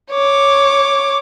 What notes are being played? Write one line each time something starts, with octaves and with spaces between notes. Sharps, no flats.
C#5 D6